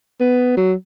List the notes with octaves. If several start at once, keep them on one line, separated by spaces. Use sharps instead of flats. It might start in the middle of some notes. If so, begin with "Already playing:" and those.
B3
F#3